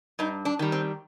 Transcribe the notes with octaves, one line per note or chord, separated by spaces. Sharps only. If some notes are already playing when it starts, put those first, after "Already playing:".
G2 D#4
D4
D#3 G3
C4